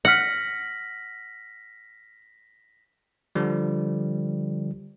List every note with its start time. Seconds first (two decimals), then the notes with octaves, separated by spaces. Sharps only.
0.05 F#5 F6 A#6 B6 F#7
3.35 D3 F3 G3